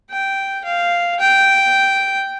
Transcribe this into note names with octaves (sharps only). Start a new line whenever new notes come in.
G5
F5
G5